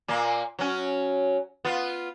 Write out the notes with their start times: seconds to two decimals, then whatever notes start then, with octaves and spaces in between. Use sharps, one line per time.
0.08 A#2 A#3
0.59 F#3 C#4
1.65 B3 F4